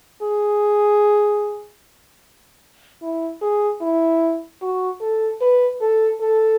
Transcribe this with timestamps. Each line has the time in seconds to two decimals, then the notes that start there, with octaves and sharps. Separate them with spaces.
0.22 G#4
3.02 E4
3.42 G#4
3.81 E4
4.62 F#4
5.01 A4
5.41 B4
5.81 A4
6.21 A4